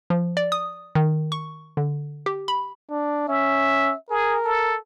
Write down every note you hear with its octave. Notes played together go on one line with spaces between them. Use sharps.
F3
D5
D#6
D#3
C#6
D3
G4
B5
D4
C#4 E5
G#4 A#4
A4